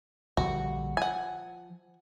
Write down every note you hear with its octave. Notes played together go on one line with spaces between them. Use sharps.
A#1 D3 G3 F#4
F3 F#5 G#5